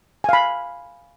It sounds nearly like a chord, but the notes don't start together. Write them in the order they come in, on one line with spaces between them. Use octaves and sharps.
G#5 F5 B5